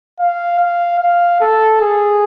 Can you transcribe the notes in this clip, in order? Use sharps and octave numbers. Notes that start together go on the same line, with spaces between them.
F5
F5
F5
A4
G#4